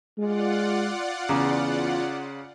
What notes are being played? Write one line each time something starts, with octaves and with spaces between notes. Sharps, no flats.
G#3 F4 D5 F#5
E2 C#3 A#5 D6